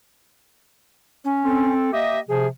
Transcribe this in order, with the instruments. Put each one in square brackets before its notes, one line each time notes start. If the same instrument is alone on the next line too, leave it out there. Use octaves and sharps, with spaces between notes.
[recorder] C#4
[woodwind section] C4 A4
[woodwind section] A#3 G4 D#5 [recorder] E5
[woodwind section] C3 F3 [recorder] G#4